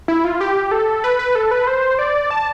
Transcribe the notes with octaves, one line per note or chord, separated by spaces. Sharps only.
E4
F4
G4
A4
B4
B4
A4
B4
C5
D5
A5